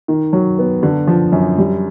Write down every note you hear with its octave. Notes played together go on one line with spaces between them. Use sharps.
D#3
F#3
B3
D3
F3
F#2
G3